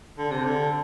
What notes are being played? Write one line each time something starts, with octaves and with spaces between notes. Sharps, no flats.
D3
C3
D3